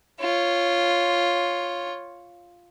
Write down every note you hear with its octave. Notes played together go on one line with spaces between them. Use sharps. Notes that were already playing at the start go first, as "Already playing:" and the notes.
F4 C#5